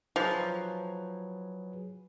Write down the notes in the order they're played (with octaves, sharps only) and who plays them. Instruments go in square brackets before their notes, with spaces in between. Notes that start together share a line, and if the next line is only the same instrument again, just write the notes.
[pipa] F3 [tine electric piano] F#3 G#4 B4